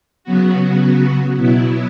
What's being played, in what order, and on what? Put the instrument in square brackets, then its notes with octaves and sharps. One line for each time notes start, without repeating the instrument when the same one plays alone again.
[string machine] C#3 F#3 B3 F#4
B2 F#3 B3 E4